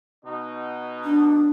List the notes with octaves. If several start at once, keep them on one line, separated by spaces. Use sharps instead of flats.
B2 D#4
D4